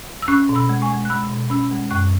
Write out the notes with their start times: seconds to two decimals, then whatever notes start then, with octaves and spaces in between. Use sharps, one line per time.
0.22 E6
0.28 C#4 C#6 F#6
0.49 B2
0.55 B5 E6
0.69 G#3
0.82 G#5 C#6
0.90 G#3
1.05 F#6
1.09 G#3 B5 E6
1.29 B2
1.50 C#4 B5 E6
1.71 G#3
1.90 F#2 C#6 F#6